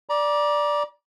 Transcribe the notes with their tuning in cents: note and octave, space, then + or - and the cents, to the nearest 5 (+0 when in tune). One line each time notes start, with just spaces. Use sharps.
D5 +0 A#5 +35